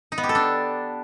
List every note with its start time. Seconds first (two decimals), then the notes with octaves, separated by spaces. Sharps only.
0.12 D#4
0.18 B3
0.23 G4
0.29 A4
0.35 D4